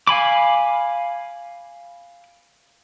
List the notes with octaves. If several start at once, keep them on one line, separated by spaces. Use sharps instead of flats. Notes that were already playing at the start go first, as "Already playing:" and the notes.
F5 G#5 B5 D6